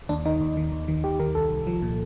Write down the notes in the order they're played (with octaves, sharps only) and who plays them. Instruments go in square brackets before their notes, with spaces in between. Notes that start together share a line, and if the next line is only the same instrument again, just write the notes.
[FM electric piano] D#2 D4
D#3 D#4
D#2
D#3
D#2
D#3
D#2 G4
D#3 A#4
C2 A4
C2
F3
A#2